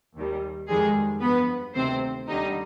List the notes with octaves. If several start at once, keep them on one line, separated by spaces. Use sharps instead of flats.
D#2 D#3 G3
F2 D#3 G3 G#3 G#4
G2 F3 B3 B4
D2 C3 D#3 C4 C5
D#2 D3 G3 D#4 D#5